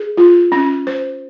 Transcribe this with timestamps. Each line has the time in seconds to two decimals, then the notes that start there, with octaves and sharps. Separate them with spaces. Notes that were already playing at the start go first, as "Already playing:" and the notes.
Already playing: G#4
0.17 F4
0.52 C#4
0.87 C5